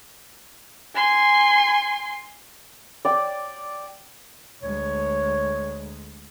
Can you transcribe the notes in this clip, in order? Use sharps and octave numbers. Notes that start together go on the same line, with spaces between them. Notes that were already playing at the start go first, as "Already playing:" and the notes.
G#5 C6
D5 G5
D2 G#3 C#5